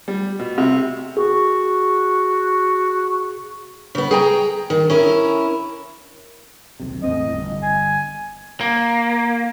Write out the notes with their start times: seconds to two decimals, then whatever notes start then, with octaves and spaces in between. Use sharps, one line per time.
0.08 G3
0.39 B2
0.58 C3
1.17 F#4 G#4
3.95 C#3 B3
4.11 G#4 G5 A#5
4.70 D#3
4.90 C#4 E4 A#4
6.80 D#1 B1 C3
7.03 E2 A2 C4 D#5
7.31 G1 G2
7.63 G#5
8.61 A#3